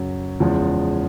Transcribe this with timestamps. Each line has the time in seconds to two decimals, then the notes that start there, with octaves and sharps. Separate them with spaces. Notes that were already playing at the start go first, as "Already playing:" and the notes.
Already playing: F#2 C#3 F#3
0.40 E2 C#3 F3 G#3